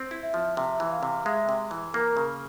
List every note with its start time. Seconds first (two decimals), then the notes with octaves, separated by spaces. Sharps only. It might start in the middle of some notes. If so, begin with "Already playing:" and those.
Already playing: C4
0.11 E4
0.23 E5
0.34 F3
0.57 C3 E5
0.80 E3
0.91 F5
1.03 C3
1.26 G#3 E5
1.49 C3
1.71 E3
1.94 A#3 A#4
2.17 C#3